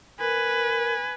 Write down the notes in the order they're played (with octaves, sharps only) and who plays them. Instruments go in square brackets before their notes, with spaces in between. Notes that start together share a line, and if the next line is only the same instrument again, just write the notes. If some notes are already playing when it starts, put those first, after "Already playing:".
[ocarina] A#4 [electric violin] B4 [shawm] G#5